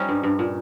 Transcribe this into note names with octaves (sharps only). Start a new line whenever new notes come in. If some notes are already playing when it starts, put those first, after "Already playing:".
Already playing: G3 C#4 D#4
G2
G2
A#2